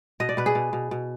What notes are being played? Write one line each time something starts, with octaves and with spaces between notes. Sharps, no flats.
B2 D#5
D5
B2 B4
G#4
B2
B2
B2